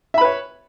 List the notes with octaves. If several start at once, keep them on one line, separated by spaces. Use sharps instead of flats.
B4 C#5 E5 B5